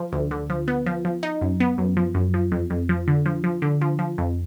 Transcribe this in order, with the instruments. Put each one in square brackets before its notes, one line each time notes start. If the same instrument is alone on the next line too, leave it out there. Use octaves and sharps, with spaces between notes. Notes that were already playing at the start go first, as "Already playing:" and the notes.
Already playing: [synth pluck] F3
D2
D3
F3
B3
F3
F3
D#4
F#2
B3
F#2
F3
F#2
F3
F2
F2
F3
D3
F3
F3
D3
F3
F3
F2